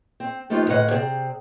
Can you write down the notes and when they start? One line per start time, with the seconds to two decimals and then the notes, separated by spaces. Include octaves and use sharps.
0.20 C4
0.50 F3 A3 B3 D#4 F4 G4
0.67 D2 A2 C#3 B4 D#5 F#5
0.91 C3 C4 G#4 D5